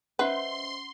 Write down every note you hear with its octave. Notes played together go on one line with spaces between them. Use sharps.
C#4 B4 C5 D#5 E5 F#5 C6